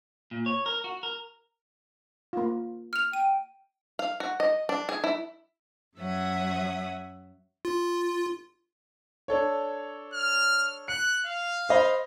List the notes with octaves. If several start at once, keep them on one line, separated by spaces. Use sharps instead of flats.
A#2
C#5
A#4
F#4
A#4
A#3 F4
F6 F7
G5 D#7
F5
F#4
D#5
D4
G#4
E4
F#2 F#3 E5 F#5 D#6
F4
D4 A4 C#5
F6
F#6 C#7
F5
C5 D#5 B5